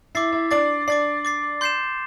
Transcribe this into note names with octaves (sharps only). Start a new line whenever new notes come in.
E4 E5 D6 A6 C7
E4 E5
D4 D5 D6 A6 C7
D4 D5 D6 A6 C7
D6 A6 C7
C6 G6 C7 E7